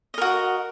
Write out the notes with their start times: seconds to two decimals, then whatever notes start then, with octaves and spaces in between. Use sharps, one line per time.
0.14 D#5
0.18 A#4
0.22 F#4